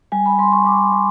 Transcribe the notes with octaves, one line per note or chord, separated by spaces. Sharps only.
G3 G#5
B5
G3 C6
C#6
G3 D6
G3